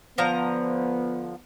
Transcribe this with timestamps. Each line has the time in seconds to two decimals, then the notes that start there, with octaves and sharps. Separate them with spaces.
0.18 D3 F3 B3 A#5